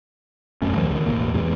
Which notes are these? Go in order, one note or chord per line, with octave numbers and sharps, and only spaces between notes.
D1 F#2 A3 C#4
D#2 D#3 F3 G#3
C#2 D#3
E1 A1 A#3
E2 G#2 E3 G#3